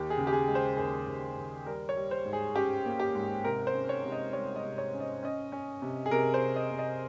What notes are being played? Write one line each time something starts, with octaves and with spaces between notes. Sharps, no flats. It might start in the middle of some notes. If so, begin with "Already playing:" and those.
Already playing: D#2 G4
G#4
C#3
G4
G#4
G#3
C5
D#2 G#4
D#2
D#2
G3 A#4
C#5
G3
C5
G#2
G#4
C#4 G4
A#3
G4
G#2
C3 A#4
C5
C#4
C#5
C3
D#5
G3 C#5
D#5
C3
C#5
C#4
D#5
C#4 D#5
C#4
C3
G#4
C3 A#4
C5
C3
D#5
C3
D#5